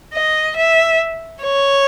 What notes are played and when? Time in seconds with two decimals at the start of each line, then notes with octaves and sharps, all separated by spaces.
0.14 D#5
0.57 E5
1.43 C#5